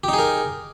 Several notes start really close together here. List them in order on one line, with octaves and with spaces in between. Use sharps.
G4 D#4 G#4 A#4